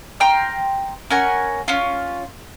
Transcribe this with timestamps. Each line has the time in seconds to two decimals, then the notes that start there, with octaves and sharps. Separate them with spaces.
0.20 G5 A#5 C6 F6
1.10 C#4 A#4 F#5 G#5
1.68 C#4 F4